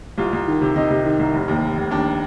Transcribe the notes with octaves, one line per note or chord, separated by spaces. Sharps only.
C2 F4
C2
D#3
C3
C3 D#4
C3
D#3
C2
F1
D#2
F1
F1
D#2 D4